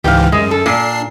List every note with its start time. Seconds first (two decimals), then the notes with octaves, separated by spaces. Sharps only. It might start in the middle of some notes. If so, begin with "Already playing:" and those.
0.04 C#2 G#2 E3 G4 F5
0.32 F#2 G#3
0.51 A4
0.66 A#2 D4 C7